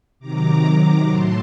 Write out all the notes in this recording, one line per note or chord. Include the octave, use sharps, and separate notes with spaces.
C3 D#3 F#3 A#5 D6
A2 F#3 A3 A5 C6